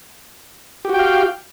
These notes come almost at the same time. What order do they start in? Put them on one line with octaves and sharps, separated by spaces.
G4 F#4 G5 F5